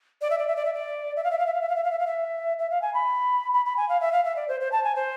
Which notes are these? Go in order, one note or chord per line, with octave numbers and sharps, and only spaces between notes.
D5
E5
D5
E5
D5
E5
D5
E5
F5
E5
F5
E5
F5
E5
F5
E5
F5
E5
F5
E5
E5
F5
G#5
B5
B5
B5
G#5
F5
E5
F5
E5
D5
C5
C5
A5
G#5
C5